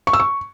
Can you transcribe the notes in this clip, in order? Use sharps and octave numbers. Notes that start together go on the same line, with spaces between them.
C#6
E6
C#6